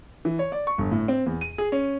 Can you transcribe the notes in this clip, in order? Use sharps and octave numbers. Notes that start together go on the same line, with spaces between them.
E3
C#5
D5
C#6
G1
A2
C4
E2
D#7
G#4
C#4